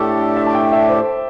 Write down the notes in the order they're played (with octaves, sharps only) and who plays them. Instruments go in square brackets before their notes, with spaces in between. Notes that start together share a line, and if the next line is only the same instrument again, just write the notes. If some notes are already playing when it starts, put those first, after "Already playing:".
Already playing: [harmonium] A2 A3 D4 G4 [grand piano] A4
[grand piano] E5
A5
G5
E5
C5